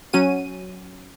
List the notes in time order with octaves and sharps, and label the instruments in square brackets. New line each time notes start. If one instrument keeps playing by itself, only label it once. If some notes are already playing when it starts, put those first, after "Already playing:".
[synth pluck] F#3 C#4 F#4 D#7